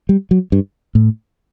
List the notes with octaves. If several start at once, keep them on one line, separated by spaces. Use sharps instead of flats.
G3
F#3
G2
A2